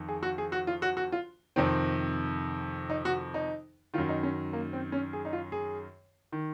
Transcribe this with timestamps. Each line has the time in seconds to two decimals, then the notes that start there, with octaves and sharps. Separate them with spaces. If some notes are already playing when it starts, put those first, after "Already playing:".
Already playing: F2 D#3
0.09 G#4
0.23 F#4
0.38 G#4
0.52 F#4
0.67 F4
0.82 F#4
0.97 F#4
1.12 F4
1.56 F2 C3 D#3 C4
2.90 D#4
3.05 F#4
3.34 D#4
3.94 D#3 F4
3.98 F#2
4.09 D#4
4.23 C#4
4.53 A#3
4.73 C4
4.92 C#4
5.13 G#4
5.25 D#4
5.33 F4
5.52 G#4
6.32 D#3